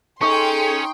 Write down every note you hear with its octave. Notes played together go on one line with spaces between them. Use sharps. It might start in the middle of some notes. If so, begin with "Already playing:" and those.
C#4 D#4 G#4 A4 G5 C6 C#6